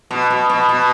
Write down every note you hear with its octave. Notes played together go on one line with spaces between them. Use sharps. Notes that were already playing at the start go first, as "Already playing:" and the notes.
B2
B2
B2
B2